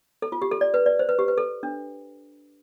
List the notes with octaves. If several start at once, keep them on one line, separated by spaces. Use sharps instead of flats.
A4
F4
G4
A4
D5
B4
D5
C5
B4
G4
B4
A4
D4